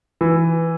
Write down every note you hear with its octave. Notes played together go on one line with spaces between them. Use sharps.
E3